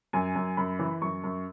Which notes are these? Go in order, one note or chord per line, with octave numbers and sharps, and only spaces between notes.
F#2 G#5
F#2
F#2 B5
E3
F#2 C#6
F#2